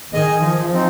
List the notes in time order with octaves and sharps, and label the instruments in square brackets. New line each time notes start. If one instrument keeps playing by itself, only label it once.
[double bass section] D#3 [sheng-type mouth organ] G#4 D#5 G#5
[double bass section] F3
[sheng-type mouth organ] C4 D#4